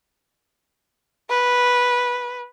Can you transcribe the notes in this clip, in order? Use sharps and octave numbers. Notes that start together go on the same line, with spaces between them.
B4